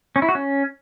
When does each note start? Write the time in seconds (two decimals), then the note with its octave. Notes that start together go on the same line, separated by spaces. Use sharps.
0.16 C#4
0.22 E4
0.29 F#4
0.35 C#4